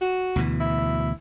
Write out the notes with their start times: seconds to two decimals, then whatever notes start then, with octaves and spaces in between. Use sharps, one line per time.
0.01 F#4
0.36 D2 B2 E3
0.60 E4